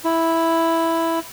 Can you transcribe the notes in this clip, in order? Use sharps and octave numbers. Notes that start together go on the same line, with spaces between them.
E4